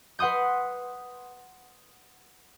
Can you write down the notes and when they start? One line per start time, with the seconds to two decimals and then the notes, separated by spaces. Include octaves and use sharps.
0.19 B4 F#5 C6 D#6 G6